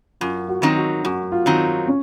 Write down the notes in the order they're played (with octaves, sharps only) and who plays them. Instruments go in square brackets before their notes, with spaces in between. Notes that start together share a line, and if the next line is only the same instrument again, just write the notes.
[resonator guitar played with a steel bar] F#2 [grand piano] F4
[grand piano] F#4
[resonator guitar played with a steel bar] D#3 F#3 C4 D#4
[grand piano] F#4
[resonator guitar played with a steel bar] F#2 [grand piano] F#4
[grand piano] F4
[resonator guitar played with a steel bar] D#3 F#3 C4 D#4
[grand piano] C#4